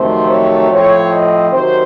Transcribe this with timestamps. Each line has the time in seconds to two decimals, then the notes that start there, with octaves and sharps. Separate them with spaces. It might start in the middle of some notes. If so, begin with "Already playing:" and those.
Already playing: F2 C3 D#3 F#3 A3 C5
0.29 C#5
0.71 A2 F3 C4 C#5
1.11 D#5
1.52 C3 D#3 F#3 C5